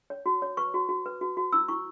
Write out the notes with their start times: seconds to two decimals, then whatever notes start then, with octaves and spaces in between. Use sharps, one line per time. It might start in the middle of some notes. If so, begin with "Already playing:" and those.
0.10 C#5
0.26 F#4
0.42 C#5
0.57 B4 C#6
0.74 F#4
0.89 F#4
1.06 B4
1.21 F#4
1.37 F#4
1.52 E4 E6
1.68 E4 C#6